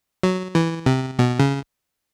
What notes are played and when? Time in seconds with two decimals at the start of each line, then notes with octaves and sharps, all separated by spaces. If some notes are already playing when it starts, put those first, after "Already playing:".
0.23 F#3
0.55 E3
0.86 C3
1.19 B2
1.39 C#3